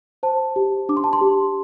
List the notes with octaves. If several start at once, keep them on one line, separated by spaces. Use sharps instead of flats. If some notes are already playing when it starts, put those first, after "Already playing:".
C5 A5
G4
D4 D6
C6
A5
C6
G4